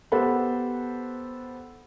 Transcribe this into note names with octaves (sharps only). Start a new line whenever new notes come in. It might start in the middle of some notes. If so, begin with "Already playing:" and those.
B3 G4 A4 C5 F#5 B5